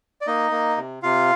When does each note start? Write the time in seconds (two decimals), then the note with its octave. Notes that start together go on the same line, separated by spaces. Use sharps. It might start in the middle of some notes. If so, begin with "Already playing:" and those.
0.21 D5
0.26 A#3 D#4 D#5
0.51 A#3
0.77 C3
1.03 C3 F4 F5